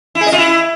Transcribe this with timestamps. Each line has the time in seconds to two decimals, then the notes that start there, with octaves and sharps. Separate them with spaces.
0.15 E4
0.21 G#4
0.27 D#5
0.32 F4
0.38 E4